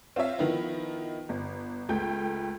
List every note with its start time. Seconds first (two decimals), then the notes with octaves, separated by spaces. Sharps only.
0.16 C4 F4 C#5 E5
0.39 D#3 F3 B3 D#4 E4
1.29 G1
1.89 C#2 A3 G5 G6